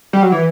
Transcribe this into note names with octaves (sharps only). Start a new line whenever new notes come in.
G3
F#3
E3